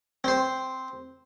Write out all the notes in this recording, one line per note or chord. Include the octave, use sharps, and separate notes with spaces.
C4 C5